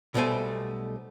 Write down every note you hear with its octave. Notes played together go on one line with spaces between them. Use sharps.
B1 B2 G3 A3 C5 G#5